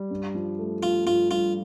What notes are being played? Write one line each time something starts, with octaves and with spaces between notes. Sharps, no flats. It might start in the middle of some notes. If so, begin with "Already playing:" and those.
Already playing: G3
G2
F3
A3
F3 F4
G2 F4
G2 F4